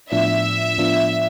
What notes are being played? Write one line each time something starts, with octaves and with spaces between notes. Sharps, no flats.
A2 F3 B3 D4 F4 E5
A2 F3 B3 D4 F4